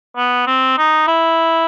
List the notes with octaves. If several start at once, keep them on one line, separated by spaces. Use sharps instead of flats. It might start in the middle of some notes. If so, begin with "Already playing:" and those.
B3
C4
D#4
E4